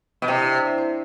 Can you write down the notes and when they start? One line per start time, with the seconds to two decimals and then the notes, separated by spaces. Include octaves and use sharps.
0.22 B2
0.28 C3 E4 E5
0.40 D4 D5
0.53 D4 D5
0.65 E4 E5
0.78 C4 C5